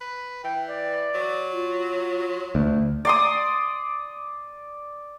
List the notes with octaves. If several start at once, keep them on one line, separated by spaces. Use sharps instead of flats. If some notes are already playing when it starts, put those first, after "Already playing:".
B4
E3 G5
D5
F#3
F4
D2
D5 C6 D#6